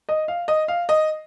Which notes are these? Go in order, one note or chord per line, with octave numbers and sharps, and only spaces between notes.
D#5
F5
D#5
F5
D#5